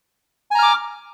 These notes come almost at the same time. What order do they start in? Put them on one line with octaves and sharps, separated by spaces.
G#5 A#5 F6 D6